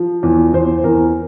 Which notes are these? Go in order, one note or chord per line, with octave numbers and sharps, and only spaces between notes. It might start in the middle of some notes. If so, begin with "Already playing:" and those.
Already playing: F3
E2
E2 C5
E2 A#4